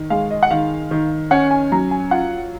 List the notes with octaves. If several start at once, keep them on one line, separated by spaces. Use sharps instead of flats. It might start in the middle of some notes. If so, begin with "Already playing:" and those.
Already playing: D#3
G#3 F5
D#5
F#5
D#3 F5
D#3
C#4 F#5
G#5
F#3 A#5
G#5
F4 F#5